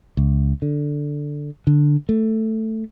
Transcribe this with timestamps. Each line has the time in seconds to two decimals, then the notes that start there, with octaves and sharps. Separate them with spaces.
0.17 C#2
0.62 D3
1.67 D3
2.09 A3